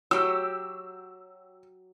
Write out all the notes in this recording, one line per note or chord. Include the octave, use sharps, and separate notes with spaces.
F#3 G4 E6